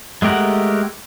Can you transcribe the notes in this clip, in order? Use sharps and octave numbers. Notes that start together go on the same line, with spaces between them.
G#3 A3 G4 A#4 F#5